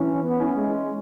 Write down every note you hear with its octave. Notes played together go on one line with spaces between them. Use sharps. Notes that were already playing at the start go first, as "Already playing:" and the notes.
Already playing: E3 C#4
B3
C#4 E4
G#3